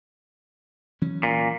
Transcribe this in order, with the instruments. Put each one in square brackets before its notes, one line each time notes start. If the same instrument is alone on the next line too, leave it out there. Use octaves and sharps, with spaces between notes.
[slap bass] E3 F#3 C#4
[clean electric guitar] A#2